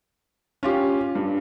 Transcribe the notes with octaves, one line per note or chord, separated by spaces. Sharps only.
C#4 F4 G4
G2